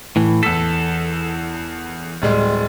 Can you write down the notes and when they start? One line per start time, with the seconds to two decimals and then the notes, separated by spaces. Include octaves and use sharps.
0.16 A2 E3
0.43 E2 A4 E6 B6
2.22 D1 G3 G#3